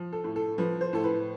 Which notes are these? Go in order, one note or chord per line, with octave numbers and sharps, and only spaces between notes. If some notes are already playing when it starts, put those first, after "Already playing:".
Already playing: F3
A4
A2
A4
F3 B4
C5
A2 A4
B4